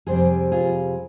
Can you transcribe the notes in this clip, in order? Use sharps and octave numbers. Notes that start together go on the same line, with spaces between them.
F2 C3 G3 C4 G#4 C5
F4 G#4